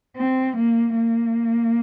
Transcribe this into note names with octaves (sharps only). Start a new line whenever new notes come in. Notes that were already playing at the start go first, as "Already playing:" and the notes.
C4
A#3
A#3